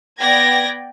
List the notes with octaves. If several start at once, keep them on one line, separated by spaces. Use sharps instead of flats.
B3 D5 G5 G#6 A#6